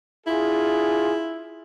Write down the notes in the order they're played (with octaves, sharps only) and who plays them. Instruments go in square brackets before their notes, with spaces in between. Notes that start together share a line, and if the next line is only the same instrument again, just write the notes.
[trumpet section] D4 F4 G#4 [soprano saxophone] E4